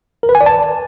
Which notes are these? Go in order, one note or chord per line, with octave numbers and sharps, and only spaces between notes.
A#4
B4
G#5
D5
A5